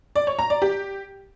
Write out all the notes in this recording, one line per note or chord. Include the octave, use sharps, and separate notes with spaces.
D5
C#5
A#5
D5
G4